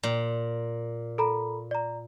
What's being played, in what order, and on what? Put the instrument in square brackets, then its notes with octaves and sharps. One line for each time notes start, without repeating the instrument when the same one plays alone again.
[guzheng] A#2
[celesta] A4 A#5 B5
D5 A#5